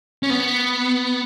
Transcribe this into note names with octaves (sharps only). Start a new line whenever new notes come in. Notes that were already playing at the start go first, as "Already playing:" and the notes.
C#4
B3